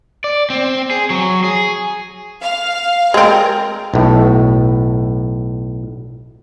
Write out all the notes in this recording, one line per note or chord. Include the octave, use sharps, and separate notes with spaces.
D5
C4
G#4
F#3
G#4
F5
G#3 C4 A#4
B1 A2